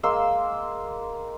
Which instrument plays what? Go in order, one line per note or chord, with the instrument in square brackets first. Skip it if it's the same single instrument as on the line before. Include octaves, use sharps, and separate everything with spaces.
[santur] G#3 A#3 C6 E6